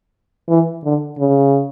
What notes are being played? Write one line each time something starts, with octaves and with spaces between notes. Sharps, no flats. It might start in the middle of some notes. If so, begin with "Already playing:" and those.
E3
D3
C#3